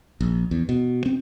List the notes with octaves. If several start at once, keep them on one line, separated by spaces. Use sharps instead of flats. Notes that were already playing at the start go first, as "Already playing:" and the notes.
A#1
E2
B2
C4